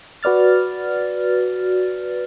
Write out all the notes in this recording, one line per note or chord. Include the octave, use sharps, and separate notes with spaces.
F#4 B4 D5 F6 A6